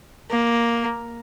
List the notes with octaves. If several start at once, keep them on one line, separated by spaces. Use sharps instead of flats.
A#3